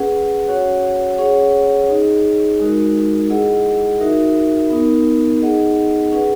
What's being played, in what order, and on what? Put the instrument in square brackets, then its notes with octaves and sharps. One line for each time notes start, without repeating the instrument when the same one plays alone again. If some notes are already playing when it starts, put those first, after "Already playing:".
Already playing: [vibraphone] C#4 G#4 B4 F#5
C#4 F#4 C#5 F#5
C#4 G#4 C#5 F#5
D#4 G#4 D#5
G#3 D#4 F#4 A#4
E4 G#4 D#5 F#5
D#4 F#4 A#4 E5
B3 D#4 A#4
D#4 G#4 D#5 F#5
C#4 G#4 B4 F#5